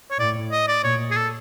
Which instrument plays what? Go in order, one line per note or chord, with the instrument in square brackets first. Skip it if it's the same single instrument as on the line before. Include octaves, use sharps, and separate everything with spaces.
[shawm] C#5
[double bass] A2 [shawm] D5
[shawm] D#5
D5
[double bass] A#2 [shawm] C#5
[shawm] G#4
A4